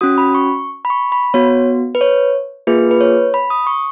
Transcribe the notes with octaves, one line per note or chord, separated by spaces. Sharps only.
C#4 F#4 D#6
B5
C#6
B5
C#6
B5
B3 F#4 C#5
B4
C#5
A#3 F4 G#4 B4
B4
C#5
B5
D#6
C#6